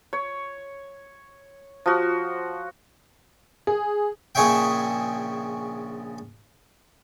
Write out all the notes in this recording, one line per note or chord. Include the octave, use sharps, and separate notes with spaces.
C#5
F3 F#4
G#4
A#1 C#3 G#4 C#5 E5 G5